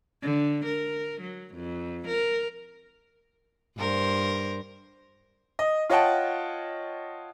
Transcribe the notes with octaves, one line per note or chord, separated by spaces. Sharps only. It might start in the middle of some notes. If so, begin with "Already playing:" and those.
D3
A#4
F#3
F2
A#4
G2 A#4 C5
D#5
F4 C#5 D#5 F#5 G5 A5